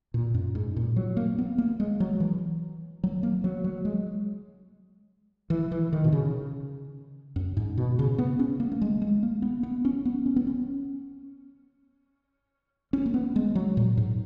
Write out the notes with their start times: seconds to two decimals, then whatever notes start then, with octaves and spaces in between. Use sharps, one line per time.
0.14 A#2
0.34 F#2
0.55 G#2
0.76 A#2
0.96 F#3
1.17 A#3
1.38 B3
1.58 A#3
1.80 G#3
2.00 F#3
2.20 E3
3.04 F#3
3.23 A#3
3.44 F#3
3.64 F#3
3.85 G#3
5.50 E3
5.71 E3
5.93 D#3
6.04 B2
6.12 C#3
7.36 F#2
7.57 G#2
7.77 B2
7.99 C#3
8.18 B3
8.39 C#4
8.60 A#3
8.72 A#3
8.82 G#3
9.02 G#3
9.23 A#3
9.42 B3
9.63 B3
9.85 C#4
10.05 B3
10.26 C#4
10.36 B3
10.47 C#4
12.93 C#4
13.06 A#3
13.14 B3
13.36 G#3
13.55 F#3
13.77 A#2
13.97 G#2